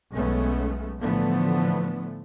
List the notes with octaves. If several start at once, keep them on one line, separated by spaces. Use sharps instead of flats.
B1 G#3 A3 B3 C#4
A2 D3 E3 F3 A3 B3